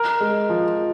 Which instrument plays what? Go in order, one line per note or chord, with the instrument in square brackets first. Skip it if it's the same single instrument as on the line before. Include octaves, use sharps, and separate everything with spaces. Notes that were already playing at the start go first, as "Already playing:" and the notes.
Already playing: [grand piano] A#4
G#3
F3